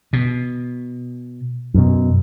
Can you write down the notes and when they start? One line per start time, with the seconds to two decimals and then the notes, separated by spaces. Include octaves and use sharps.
0.13 B2
1.74 F#2 B2